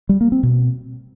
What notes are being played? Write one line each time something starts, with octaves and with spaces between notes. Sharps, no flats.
G3
A#3
C4
B2